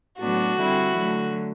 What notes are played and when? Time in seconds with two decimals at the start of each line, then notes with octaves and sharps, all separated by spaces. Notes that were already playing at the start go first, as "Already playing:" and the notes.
0.19 A2 F#3 B3 D4 F#4
0.58 D3 G3 C4 E4
0.97 D3 F#3 A3